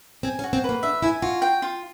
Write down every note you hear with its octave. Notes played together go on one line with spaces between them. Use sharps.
C4 G#5
C#4
F#4
C4
A#3 B4
D4 E5
E4 G#5
F4 F#4
G5
F4